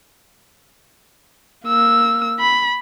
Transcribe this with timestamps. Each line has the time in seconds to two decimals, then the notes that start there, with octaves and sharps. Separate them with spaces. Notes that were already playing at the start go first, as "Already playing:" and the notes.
1.66 A#3 E6
2.40 B5